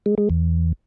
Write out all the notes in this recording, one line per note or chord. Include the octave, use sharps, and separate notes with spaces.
G#3
G#3
E2